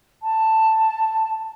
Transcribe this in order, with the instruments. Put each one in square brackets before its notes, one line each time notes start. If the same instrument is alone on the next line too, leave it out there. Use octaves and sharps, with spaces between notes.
[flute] A5